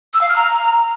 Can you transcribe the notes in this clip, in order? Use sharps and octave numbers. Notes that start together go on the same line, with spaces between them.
E6
F5
F6
A#5